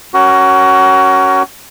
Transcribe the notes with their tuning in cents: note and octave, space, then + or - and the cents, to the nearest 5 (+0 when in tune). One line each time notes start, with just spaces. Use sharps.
C#4 +0 F#4 +20 A#4 +0